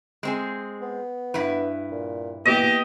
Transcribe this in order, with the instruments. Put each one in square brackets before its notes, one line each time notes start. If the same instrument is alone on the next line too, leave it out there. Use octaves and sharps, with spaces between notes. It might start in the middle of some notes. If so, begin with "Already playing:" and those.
[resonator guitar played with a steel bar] G#3 C4 G#4
[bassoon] B3
[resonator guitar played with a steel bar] G2 E4 B4
[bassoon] A#2
[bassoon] E3 [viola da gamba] A#3 B3 G4 [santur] D#5